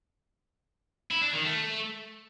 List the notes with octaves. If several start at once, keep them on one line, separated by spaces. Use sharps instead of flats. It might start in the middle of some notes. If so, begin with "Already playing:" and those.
E4
D4
D#3
A3